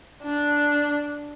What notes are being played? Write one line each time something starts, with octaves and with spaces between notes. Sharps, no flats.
D4